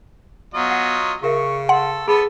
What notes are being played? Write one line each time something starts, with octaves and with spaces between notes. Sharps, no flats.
F#3 B3 F4 D#5
F#5
C#3 F4 A#4 E5 C#6
A4 F#5 C6
B3 G#4 A4 B5